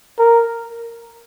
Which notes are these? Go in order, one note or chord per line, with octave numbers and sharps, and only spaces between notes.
A#4